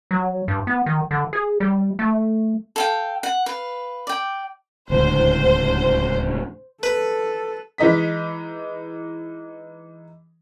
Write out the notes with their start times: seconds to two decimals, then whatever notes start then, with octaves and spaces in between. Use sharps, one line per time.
0.11 F#3
0.48 G2
0.67 B3
0.86 D#3
1.11 D3
1.33 G#4
1.60 G3
1.99 A3
2.76 A4 F5 G5
3.23 F#5
3.46 B4 F5
4.07 D5 G5
4.90 D1 C#2 D3 C5
6.83 A4 B4
7.78 E3 G#3 D#4 D#5 B6